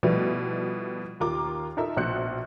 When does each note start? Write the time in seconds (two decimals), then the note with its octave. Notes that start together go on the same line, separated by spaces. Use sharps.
0.03 B2 F3 G3 A3 B3 E4
1.20 D#2 F4 A#4 D6
1.77 D#4 F4 A4 A#4 E5
1.97 A#1 B2 C5 F#6 C#7